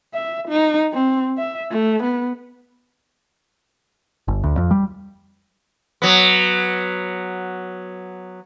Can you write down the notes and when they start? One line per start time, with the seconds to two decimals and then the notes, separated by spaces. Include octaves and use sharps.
0.14 E5
0.48 D#4
0.93 C4
1.38 E5
1.71 A3
2.03 B3
4.28 G1
4.43 D2
4.57 F2
4.71 G3
6.02 F#3 B3